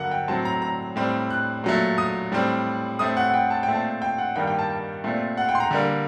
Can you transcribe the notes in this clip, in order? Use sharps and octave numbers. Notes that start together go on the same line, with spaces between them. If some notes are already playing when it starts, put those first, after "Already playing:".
Already playing: G2 D3 F#3 A#3 F#5
G5
A2 F#3 C4 A5
A#5
A#5
A2 G3 C4
F#6
A#2 F#3 A3
D#6
A2 G3 C4
A2 A3 C4 D#6
F#5
F#5
G5
A5
G5
A#2 A3 C4
A5
G5
F#5
G2 D#3 G3 A#3 G5
G5
A5
A5
A#2 A3 C4
F#5
G5
C6
A#5
D3 G3 A#3